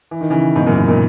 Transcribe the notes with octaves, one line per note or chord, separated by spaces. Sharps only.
E3
D#3
C#3 E3
G#2 B2
F#2 A#2
G#2
A#2